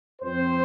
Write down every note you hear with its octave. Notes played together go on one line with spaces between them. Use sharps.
F2 F3 C4 C5